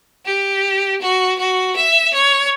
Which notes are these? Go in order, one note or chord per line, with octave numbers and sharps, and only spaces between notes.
G4
F#4
F#4
E5
C#5